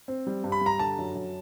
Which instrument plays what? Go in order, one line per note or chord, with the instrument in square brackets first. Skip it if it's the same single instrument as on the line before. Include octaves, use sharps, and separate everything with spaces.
[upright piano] C4
G3
G2
[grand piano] B5
[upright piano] G2 [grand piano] A#5
[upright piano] D3 [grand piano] A5
[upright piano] F#2
F#2